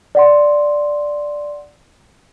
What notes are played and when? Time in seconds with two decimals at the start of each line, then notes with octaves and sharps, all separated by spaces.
0.15 D5 F#5 C6